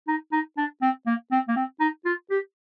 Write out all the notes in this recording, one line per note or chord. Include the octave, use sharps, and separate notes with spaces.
D#4
D#4
D4
C4
A#3
C4
A#3
C4
D#4
F4
G4